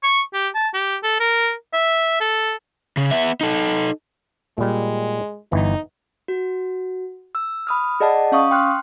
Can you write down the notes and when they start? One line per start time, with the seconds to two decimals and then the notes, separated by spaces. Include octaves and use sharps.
0.03 C#6
0.34 G4
0.55 A5
0.74 G4
1.03 A4
1.20 A#4
1.73 E5
2.20 A4
2.97 C#3
3.11 B3 E5
3.41 D#4 A4
4.58 A#2 G3 G#3
5.52 G1 E3 D#4
6.28 F#4
7.35 E6
7.67 B5 D#6 F6
8.00 G#4 D5 D#5 F#5 A5
8.32 C#4 F5 C#6 D#6
8.51 G5 C6 F6 F#6